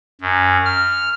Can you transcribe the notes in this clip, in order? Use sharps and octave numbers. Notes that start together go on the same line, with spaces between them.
F#2
F6